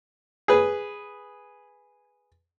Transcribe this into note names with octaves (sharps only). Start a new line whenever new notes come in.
G#4 B4